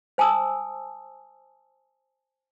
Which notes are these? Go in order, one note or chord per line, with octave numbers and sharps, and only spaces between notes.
C5 G#5 A5 D#6 E6